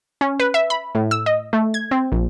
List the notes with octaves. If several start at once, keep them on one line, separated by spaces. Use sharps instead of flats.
C#4
B4
E5
B5
A2
E6
D#5
A3
G#6
C4
A#1